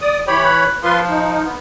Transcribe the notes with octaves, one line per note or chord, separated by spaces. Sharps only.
D5 D#6
E3 G4 C#5 B5
B4
F3 F4 B4 C6
D#4
B3